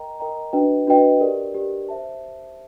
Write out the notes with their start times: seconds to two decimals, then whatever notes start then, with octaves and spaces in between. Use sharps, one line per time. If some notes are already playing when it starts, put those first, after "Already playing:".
Already playing: A#4 D#5 G5 A#5
0.20 A#4 D#5 G5 A#5
0.53 D4 F#4 B4 D#5 G5
0.87 D4 F#4 B4 D#5 G5
1.20 G4 A#4 D5
1.55 G4 A#4 D5
1.89 C5 E5 A5